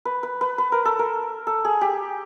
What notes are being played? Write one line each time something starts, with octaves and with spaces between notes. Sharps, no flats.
B4
B4
B4
B4
A#4
A4
A#4
A4
G#4
G4